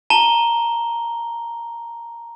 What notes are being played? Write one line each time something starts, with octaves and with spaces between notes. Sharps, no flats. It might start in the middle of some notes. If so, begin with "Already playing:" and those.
A5 A#5 G7